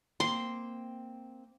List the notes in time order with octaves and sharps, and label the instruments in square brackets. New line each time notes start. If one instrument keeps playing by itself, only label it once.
[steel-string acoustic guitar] A#3 C4 G5 [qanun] C6